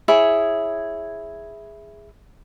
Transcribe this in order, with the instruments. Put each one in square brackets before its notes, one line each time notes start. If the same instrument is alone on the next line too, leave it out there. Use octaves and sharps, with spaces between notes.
[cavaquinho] E4 G#4 C#5